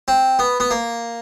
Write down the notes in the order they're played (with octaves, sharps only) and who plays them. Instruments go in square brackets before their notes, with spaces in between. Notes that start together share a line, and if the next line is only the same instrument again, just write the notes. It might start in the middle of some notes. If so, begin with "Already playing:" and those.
[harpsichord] C4
B3
B3
A#3